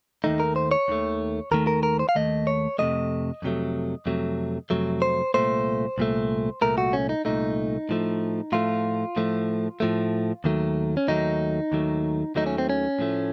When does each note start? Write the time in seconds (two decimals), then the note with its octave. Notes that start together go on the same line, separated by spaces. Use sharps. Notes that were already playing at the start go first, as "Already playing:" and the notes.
0.24 D#2 D#3 A3 D#4
0.40 A#4
0.56 C5
0.71 C#5
0.88 D#2 D#3 A3
1.51 D#2 D#3 A3 A#4
1.67 A#4
1.83 A#4
1.99 C5
2.09 F5
2.15 D#2 D#3 A3 D#5
2.47 C#5
2.79 F2 C3 F#3 A3 D#5
3.42 F2 C3 F#3 A3
4.06 F2 C3 F#3 A3
4.70 F2 C3 F#3 A3
5.02 C5
5.34 C2 A#2 A3 C5
5.98 C2 A#2 A3
6.62 C2 A#2 A3 A#4
6.78 F#4
6.93 C#4
7.09 D#4
7.25 C2 A#2 A3 D#4
7.89 A2 F3 A3
8.52 A2 F3 A3 F4
9.16 A2 F3 A3
9.80 A2 F3 A3
10.44 D#2 D#3 F#3 A3
10.97 C#4
11.08 D#2 D#3 F#3 A3 D#4
11.72 D#2 D#3 F#3 A3
12.35 D#2 D#3 F#3 A3 D#4
12.46 C#4
12.58 C4
12.70 C#4
12.99 A2 F3 A3